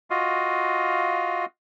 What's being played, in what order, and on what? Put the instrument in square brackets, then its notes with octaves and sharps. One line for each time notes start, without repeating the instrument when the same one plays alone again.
[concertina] F4 F#4 D#5 F5